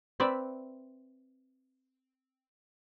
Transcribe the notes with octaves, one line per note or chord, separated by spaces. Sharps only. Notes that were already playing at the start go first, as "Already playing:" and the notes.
C4 B4 D5 E5